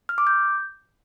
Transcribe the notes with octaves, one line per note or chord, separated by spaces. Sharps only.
F6
D6
G6